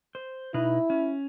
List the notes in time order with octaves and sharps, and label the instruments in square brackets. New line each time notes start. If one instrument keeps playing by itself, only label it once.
[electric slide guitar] C5
[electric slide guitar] B2 D#4 B4 [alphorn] E4
[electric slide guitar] C#4